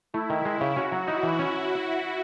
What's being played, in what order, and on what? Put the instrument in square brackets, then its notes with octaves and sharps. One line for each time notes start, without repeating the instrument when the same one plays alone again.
[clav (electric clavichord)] A3 [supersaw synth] E4
[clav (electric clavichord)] D#3
G#3
C#3
[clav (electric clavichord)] C#4 [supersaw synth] F#4
[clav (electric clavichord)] F#3
[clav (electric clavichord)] D#4 [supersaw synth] E4
[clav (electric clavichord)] E3
C#4